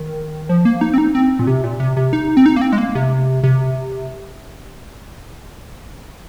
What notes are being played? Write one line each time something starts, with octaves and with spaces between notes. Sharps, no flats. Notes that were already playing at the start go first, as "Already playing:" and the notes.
Already playing: D#3
F3
A#3
D#4
C4
D#4
C4
A#2
C3
A#2
C3
C3
D#4
C4
D#4
A#3
C4
G#3
A#3
C3
C3